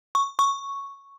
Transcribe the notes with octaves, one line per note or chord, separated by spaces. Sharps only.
C#6
C#6